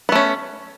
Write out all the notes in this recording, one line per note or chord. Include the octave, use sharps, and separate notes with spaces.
A3 B3 C#4